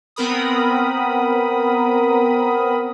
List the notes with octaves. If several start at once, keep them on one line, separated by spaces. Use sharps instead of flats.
B3 C4 A#4 B5 D#6